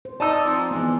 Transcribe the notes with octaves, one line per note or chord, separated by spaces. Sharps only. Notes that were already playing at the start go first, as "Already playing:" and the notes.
C5
D#4 D5 A5 E6
F3 C4
G#2 E3 B3 D4